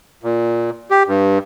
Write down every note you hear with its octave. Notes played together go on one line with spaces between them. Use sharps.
A#2
G4
G2